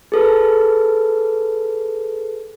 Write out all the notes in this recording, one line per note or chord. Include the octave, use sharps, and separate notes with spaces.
G#4 A4 B4